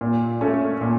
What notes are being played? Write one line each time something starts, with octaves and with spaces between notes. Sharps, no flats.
A#2
A3 C#4 A4
A#2